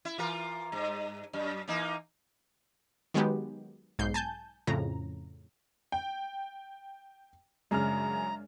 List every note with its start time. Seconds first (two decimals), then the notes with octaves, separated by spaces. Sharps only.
0.05 E4
0.18 E3 F4 A#4
0.72 G2
1.33 F#2
1.68 E3 A#3 D#4
3.14 D#3 F#3 G#3 B3 G4
3.99 B1 G#2 G6 C7
4.14 G#5 A5 G6
4.67 F2 A2 C#3 A#5
5.92 G5
7.71 F#2 C#3 G#3 D4 A#5 F6